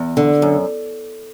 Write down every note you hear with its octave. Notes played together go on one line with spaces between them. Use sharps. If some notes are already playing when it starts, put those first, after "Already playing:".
Already playing: E2
D3
F#2